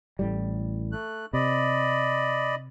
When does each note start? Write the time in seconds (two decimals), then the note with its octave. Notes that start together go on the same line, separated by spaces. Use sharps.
0.19 A1 A2 G3
0.92 A3 F#6
1.33 C3 D5 D#5 B5